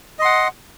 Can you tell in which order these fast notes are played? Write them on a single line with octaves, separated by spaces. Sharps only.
D#5 C6 F#5